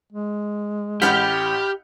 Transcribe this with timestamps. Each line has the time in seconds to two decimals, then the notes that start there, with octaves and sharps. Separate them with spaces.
0.12 G#3
1.02 A1 G4 F#5 B5 F6 G6